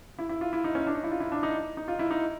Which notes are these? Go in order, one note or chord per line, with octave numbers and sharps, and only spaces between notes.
E4
E4
F4
E4
D#4
C#4
D4
D#4
E4
F4
E4
D4
D#4
D#4
F4
E4
D#4